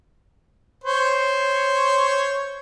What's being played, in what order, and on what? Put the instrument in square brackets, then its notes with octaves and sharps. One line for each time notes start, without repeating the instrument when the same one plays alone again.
[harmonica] C5 C#5